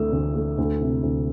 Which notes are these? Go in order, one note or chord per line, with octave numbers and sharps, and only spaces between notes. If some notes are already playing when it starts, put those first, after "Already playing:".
Already playing: D2 D3 A3 E6
D2
A3
D2
C3
D2